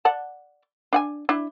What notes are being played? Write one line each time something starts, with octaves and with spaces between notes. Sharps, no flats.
D5 F#5 A5
D4 F#5 G#5
D4 E4